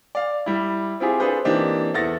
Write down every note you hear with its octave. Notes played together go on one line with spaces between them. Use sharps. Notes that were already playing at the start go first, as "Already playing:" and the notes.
D5 F5
G3 E4
C4 E4 F4 G4 G#4
D4 F4 G#4 A4 B4 C5
E3 A#3 C4 D4 D#4 G4
E2 A4 E5 F#5 A6 A#6